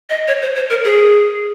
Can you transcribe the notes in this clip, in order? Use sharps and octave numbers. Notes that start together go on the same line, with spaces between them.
D#5
C#5
C5
C5
A#4
G#4